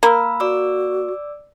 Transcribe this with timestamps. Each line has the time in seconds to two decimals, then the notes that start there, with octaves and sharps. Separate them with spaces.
0.03 A#3 B5 E6
0.40 F#4 D5 D6 E6